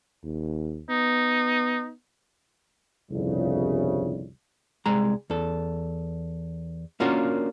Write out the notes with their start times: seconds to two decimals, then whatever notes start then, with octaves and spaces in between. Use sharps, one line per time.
0.23 D#2
0.89 B3 D#4
3.10 G1 C2 F2 C#3
4.86 C2 G#3 A#5
5.30 E2 A4
7.00 A#3 C#4 D4 F4 F#4 A#4